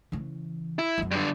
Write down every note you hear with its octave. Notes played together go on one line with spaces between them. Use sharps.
C#3 E3
E4
F#2 F#3
G2 D3